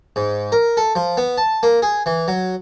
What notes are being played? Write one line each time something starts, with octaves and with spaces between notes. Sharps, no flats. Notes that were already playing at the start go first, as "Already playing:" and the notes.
G#2
A#4
A4
F3
B3
A5
A#3
G#4
E3
F#3